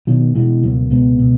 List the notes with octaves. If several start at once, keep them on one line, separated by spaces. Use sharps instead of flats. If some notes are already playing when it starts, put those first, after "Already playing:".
B2 D#3 F#3
B2 E3 G#3
C#2 F#3 A#3
B2 G#3 B3
B2